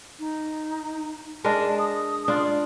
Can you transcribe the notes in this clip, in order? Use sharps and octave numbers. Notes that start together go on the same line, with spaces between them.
D#4
G#3 D4 A#4 A5
D#6
D4 F4